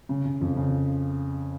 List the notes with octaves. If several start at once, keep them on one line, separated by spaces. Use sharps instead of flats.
C#3
C#3
F2
C#3